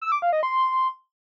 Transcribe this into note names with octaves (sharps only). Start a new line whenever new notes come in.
E6
D6
F5
D#5
C6